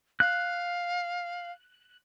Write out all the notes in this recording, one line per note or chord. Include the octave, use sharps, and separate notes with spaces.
F5 F#6